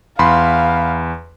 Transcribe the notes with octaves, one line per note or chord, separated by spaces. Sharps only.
E2 F5 B5 C6